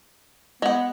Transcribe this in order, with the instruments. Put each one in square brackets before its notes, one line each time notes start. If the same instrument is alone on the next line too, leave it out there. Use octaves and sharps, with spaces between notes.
[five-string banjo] G#3 F#5 [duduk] B3